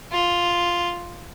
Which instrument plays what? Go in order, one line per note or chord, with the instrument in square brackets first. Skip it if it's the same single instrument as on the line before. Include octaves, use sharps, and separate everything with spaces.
[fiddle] F4